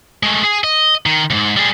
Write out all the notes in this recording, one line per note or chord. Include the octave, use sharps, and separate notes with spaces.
G#3 A3
G#4
D#5
D#3
C#2 G#2
G3 G#4